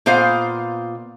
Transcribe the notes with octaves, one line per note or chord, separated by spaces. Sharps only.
A#2 B3 C5 D#5 F5